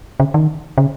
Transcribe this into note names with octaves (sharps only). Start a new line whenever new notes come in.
C#3
D#3
C#3